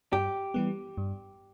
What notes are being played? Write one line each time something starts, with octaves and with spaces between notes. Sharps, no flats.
G2 G4
E3 G3 B3
G2